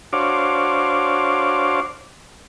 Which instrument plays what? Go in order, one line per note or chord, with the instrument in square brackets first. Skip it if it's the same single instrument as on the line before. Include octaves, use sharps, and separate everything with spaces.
[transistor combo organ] D4 F#4 C5 C#5 F5 D6